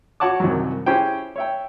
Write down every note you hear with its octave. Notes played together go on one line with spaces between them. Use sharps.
F#4 C#5 F#5 A5 D6
C2 F#2 D#3 F3 F#3
C#4 E4 G4 G#4 C5 G5
C#5 E5 G5